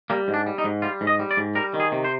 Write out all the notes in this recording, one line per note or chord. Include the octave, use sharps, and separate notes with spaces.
G3 A#3
G#2
D4
G3
D#4
G#2
G3 F4
G#2
D#5
G3
D5
G#2
G3 A#4
D#3
G#4
C3
C5